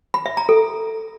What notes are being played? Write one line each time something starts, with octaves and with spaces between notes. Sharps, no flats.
B5
E5
A#5
A4